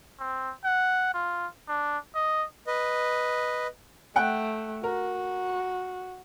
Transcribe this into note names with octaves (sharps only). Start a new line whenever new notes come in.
C4
F#5
F4
D4
D#5
B4 D#5
A3 F#5 G5 F#6
F#4 A#4